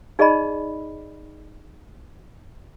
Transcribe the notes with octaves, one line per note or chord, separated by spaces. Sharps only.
D#4 G#4 D5 D#5 A5 B5